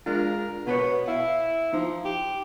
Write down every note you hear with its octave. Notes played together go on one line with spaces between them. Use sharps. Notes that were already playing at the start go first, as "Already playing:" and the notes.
G#3 D4 F4 A#4
B2 B3 B4 C#5
E4 F5
F3 D#4
G4